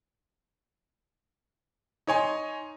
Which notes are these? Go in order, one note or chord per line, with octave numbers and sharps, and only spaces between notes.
D#4 C#5 G#5 C6